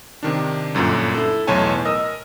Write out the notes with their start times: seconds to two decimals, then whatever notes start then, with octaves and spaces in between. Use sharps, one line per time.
0.23 C3 D#3 D4
0.75 G1 F#2 A#2 D3
1.14 E4 A4
1.47 B1 E2 A2 C#5 G#5 A5
1.85 A#4 D#5 D#6 E6